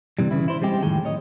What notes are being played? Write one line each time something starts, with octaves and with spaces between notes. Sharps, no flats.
C3 E3 G3
C#3 E3 E4
E4 C5
G3 G#3 C4 G4
F2 A2 D#3 G#4 G5
C#5 D#5